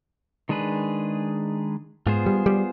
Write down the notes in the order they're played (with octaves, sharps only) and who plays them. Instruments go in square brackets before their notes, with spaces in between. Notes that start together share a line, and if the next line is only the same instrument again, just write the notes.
[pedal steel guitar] D#3 G#3 D4 G#4 B4
[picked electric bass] G#2 [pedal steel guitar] B3 F4 G#4 C5
[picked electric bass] G3
G3